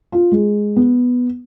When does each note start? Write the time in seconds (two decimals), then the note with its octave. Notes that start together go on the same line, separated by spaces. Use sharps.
0.12 F4
0.31 G#3
0.76 B3